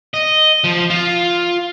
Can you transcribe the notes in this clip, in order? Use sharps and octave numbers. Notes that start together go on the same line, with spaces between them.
D#5
F3
F4